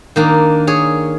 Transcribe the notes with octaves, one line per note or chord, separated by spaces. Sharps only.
D#3 A#3 D4
G#4 C#5